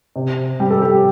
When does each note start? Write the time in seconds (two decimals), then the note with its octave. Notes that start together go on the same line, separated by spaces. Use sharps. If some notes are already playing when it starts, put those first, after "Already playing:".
0.16 C3
0.60 G3 G4
0.70 A4
0.82 G4